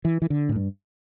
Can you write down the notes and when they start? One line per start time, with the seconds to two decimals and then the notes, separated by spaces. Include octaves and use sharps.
0.05 E3
0.22 E3
0.30 D3
0.49 A2
0.56 G2